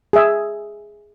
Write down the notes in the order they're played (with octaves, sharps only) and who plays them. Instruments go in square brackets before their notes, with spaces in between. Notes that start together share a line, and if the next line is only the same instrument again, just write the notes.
[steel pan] G#4 E5